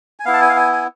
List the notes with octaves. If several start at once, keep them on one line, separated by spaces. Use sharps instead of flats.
G#5
B3 E4 F5
A5
G#5
F5
G#5
G#5